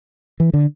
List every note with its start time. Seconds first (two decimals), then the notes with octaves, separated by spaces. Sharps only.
0.40 E3
0.54 D3